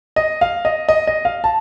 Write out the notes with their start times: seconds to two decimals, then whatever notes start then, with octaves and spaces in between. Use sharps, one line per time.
0.16 D#5
0.41 F5
0.65 D#5
0.89 D#5
1.07 D#5
1.25 F5
1.44 A5